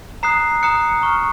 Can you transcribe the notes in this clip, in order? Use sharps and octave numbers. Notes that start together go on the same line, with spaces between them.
A#5 D#6 F#6 C7
A#5 D#6 F#6 C#7
A#5 C#6 F6